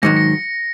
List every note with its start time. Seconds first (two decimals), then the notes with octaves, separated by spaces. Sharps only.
0.02 G#2 D#3 F#3 A#6 C#7
0.16 A#6 C#7